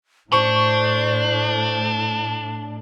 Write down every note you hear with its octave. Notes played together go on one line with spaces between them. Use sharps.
A2 D4 C5 C#6